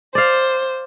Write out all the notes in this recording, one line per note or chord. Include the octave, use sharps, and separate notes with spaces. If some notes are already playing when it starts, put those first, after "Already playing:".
C5 D5 F5